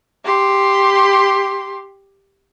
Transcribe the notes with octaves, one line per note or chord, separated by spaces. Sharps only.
G4 C6